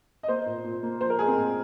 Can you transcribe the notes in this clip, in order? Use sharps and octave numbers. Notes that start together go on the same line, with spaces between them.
D#5
A#3 C5
A#2
A#2
A#3
F3 C5
A#4
G#3 G#4
C4
A#2